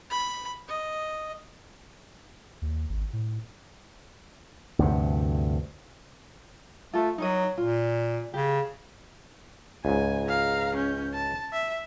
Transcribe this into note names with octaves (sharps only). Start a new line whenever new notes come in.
B5
D#5
D#2
G#1
A2
D2 G2 C3
A3 F4 A4
F#3 D#4 A#4 D#5
A#2 F4
C#3 G4
C#2 G#2 G#5
F5 A#5
C#4 G6
A5
E5